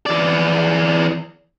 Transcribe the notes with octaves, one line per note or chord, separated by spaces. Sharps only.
E3 D5